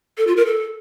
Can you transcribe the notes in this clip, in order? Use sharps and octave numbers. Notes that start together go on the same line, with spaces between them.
A4
F4
A#4
A4